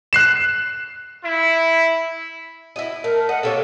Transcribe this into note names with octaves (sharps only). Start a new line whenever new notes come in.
F#6 C7 E7
E4
E4 F#4 D#5
A3 A#4
D#5 F#5
C3 A#3 A4 C#5